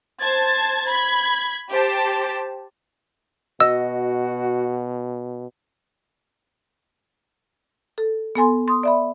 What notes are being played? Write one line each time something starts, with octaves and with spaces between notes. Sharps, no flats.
C5 A5 G#6 A6
B5 G#6
G4 C5 A5
B2 F#4 D#5 E6
A4
B3 A4 G#5 C6
C6 D#6
D5 E5 B5